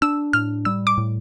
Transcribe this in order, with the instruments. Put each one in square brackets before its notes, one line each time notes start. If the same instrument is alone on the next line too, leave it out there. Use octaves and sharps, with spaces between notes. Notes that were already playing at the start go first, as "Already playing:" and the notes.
[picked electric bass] D4 [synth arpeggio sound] E6
[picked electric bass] A2 [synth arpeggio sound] F6
[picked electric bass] G3 [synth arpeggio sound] E6
[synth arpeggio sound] D6
[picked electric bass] A2